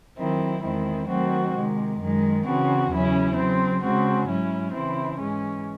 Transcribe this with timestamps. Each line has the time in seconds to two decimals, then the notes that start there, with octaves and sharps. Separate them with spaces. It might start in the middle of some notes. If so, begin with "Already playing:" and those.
0.17 D#3 F#3 C4 E4
0.61 E2 D#3 G#3 C4 E4
1.07 D#3 F#3 A3 C4 F#4
1.53 C3 D#3 G#3
1.98 F#2 D#3 G#3
2.44 C#3 E3 C4 F#4
2.90 E2 C#3 F#3 C#4 E4
3.36 C#3 F#3 C4
3.81 C#3 G#3 C4 F#4
4.27 G#2 F#3 C#4 E4
4.73 C#3 E3 C4 E4
5.18 G#2 E3 G#3 C#4